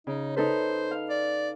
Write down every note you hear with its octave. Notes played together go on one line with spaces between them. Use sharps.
C#3 D#4
D#4 A4 B4 C5
F5
D5